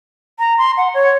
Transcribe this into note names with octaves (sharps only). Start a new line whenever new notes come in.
A#5
C6
F#5
C#5